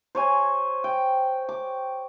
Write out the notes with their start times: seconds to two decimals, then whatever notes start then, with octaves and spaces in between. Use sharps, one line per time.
0.15 C5 C#5 G#5
0.84 G5
1.49 D6